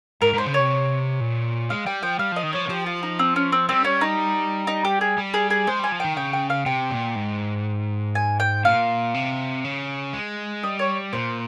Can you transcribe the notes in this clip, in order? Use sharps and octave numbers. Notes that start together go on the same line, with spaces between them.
G#2 A#4
G#2 C5
C#3
C3 C#5
A#2
G#3 F5
G3 G5
F3 G5
G3 F5
F3 D#5
D#3
F3 C#5
D#3
F3 G4
F4
D#4
C4
C#4
C4
G3 C4
C#4
D#4
D#4
G4
G#4
G3
G#4
G#4
G#3 C5
G3 G#5
F3
D#3 G5
C#3 G5
G5
F5
C3 G5
A#2
G#2
G#5
G5
A#2 F5
C3
C#3
G#3
G3 D#5
C#5
A#2 C5